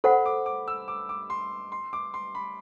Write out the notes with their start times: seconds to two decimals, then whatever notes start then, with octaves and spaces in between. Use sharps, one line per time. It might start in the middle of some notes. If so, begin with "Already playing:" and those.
0.04 A4 C5 F#5 B5
0.26 D6
0.46 D6
0.68 E6
0.88 D6
1.09 D6
1.30 C6
1.72 C6
1.93 D6
2.14 C6
2.35 B5